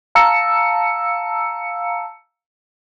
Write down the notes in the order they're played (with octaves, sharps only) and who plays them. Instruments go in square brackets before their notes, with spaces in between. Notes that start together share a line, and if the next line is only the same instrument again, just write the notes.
[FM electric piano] F5 A5 A#5 E6 C#7